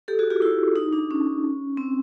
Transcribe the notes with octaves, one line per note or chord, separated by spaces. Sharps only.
G4 A4
F#4 G#4
F4 G4
E4 F#4
D#4
D4
C#4
C4